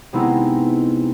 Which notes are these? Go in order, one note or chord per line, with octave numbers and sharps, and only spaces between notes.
C3 G#3 B3 C4 D#4 E4